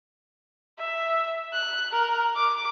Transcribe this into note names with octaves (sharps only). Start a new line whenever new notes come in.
E5
F#6
A#4
D6